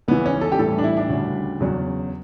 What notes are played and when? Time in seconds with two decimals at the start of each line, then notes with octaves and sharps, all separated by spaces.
0.08 C#2 C#3 E3 B3
0.26 C#4
0.41 A4
0.52 G4
0.59 A2 E3 G3 A4
0.78 D4
0.84 E4
0.97 D4
1.09 D2 C#3 G3
1.60 E2 C#3 F#3